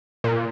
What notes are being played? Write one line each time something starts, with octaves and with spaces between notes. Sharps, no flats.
A#2